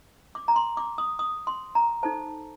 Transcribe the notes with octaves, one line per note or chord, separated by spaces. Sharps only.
D6
A#5
C6
D6
D#6
D#6
C6
A#5
D#4 A4 C5 A5